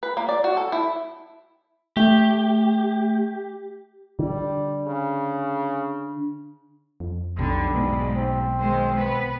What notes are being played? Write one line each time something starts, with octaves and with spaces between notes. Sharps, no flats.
B4
A#3
D5
F#4
A4
E4
A3 G4
D3 G3
C#3
F2
B1 D3 G3
G#2 B2
C4
D#3 G#3 C5
B3 B4